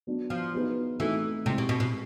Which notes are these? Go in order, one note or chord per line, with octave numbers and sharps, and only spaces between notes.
F#3 B3 D4
F3
F#3 B3 D#4 G#4 B4
E3 A3 C4 D#4 F#4 A4
C3 G#3 C4 E4 G#4
B2
B2
B2